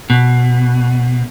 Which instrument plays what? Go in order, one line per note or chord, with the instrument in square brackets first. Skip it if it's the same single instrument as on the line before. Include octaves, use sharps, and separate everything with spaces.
[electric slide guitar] B2